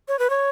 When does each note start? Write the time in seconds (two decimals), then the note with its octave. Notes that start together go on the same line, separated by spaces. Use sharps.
0.08 C#5
0.19 B4
0.30 C#5